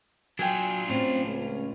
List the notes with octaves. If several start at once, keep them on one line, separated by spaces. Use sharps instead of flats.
F#3 D4 F4 G5 G#5
A2 C4 C#4
C#2